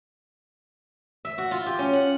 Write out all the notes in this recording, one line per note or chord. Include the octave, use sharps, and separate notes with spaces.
E5
F#4
F4
G4
C#4
F#5